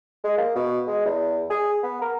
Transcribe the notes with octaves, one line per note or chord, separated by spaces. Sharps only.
G#3
A#3
B2
G#3
E2
G#4
B3
A#4